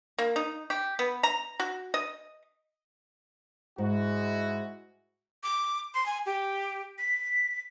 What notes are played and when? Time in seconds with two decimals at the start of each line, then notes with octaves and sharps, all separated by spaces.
0.19 A#3
0.36 D#4
0.70 G4
0.99 B3
1.23 A#5
1.60 F#4
1.94 D#5
3.78 G#2 G#3 E4 F#4
5.43 D6
5.94 C6
6.06 G#5
6.26 G4
6.98 B6